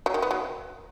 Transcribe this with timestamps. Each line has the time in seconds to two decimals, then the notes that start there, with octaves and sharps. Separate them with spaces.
0.06 F#3
0.14 D#3
0.22 B3
0.31 F#3